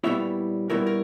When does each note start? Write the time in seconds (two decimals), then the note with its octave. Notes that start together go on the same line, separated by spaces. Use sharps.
0.04 A#2 G3 B3 E4 C#5 E5
0.70 A#2 G3 B3 E4 A#4 C#5
0.86 A#4 C#5